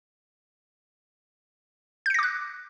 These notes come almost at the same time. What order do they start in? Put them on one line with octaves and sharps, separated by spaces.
G6 C#7 A#6 D6 F#6